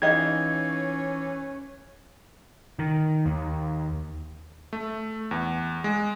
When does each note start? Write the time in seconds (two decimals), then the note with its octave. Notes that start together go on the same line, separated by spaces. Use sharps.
0.02 E3 C#4 D#4 G4 D#5 F5 G#6
2.79 D#3
3.26 D#2
4.73 A3
5.31 E2
5.84 G#3